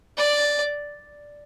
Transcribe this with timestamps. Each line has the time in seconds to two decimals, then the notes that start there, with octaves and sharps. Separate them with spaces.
0.18 D5